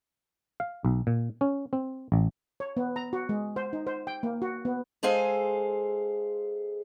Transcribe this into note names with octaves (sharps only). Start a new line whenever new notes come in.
F5
B1
A#2
C#4
C4
A1
C#5
B3
A#5
F#4
G#3
C5
D#4
C5
G5
A#3
F#4
B3
G#3 G#4 A4 C5 F5 G#5